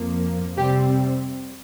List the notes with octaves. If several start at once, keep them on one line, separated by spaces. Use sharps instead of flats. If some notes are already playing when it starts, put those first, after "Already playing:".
Already playing: F2 F3 A#3
C3 G3 C4 G4